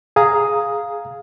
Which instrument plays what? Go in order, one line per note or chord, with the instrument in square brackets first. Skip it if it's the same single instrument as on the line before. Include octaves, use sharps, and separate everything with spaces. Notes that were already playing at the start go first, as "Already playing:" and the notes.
[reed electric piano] G#4 F5 A#5 D#6